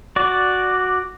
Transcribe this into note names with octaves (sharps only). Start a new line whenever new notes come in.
F#4 D5